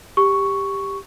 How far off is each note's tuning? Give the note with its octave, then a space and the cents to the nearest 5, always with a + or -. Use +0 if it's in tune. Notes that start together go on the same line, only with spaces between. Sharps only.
G4 +10 C#6 +0